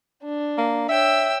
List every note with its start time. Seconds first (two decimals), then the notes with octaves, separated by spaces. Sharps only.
0.23 D4
0.58 A#3
0.89 C#5 E5 G5 E6